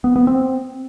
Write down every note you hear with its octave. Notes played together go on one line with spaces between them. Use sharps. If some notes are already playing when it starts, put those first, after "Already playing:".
B3
B3
C4